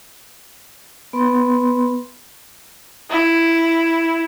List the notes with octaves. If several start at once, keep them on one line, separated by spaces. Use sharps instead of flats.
B3 B4 B5 C6
E4